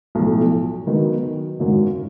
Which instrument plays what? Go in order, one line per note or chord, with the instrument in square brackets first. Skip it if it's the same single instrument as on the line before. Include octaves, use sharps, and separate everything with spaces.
[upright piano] B1 A2 F3
D#3 F#3 B3
G#1 F#2 D#3 F#3